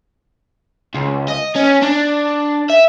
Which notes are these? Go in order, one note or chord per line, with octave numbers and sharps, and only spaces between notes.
C#2
D#5
C#4
D4
E5